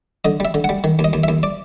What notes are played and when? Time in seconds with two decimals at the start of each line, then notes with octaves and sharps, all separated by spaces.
0.25 D3 D#5
0.40 G3 E5
0.54 D3
0.64 G3 F#5
0.84 D#3
0.99 D#2
1.04 D#5
1.13 D#2
1.24 D#2 E5
1.43 D5